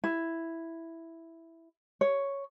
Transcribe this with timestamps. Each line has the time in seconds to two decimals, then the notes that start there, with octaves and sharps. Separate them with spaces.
0.04 E4
2.01 C#5